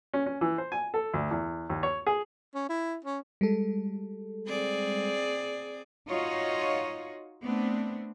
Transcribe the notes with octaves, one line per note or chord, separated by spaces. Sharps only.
C#4
C#4
E3
C5
G#5
A4
D2
E2
D#2
C#5
G#4
C#4
E4
C#4
G3 G#3 A4
C4 G#4 D5
D#4 F4 F#4 C#5 D#5
A3 B3 C4 D4